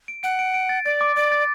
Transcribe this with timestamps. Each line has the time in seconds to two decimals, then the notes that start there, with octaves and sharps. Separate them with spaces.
0.08 D7
0.23 F#5 D7
0.39 D7
0.54 D7
0.69 A6
0.85 D5 A6
1.01 D6
1.16 D5 A6
1.32 A6